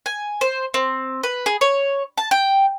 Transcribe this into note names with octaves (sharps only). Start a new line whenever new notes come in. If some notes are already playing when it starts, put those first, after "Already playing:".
G#5
C5
C4
B4
G#4
C#5
A5
G5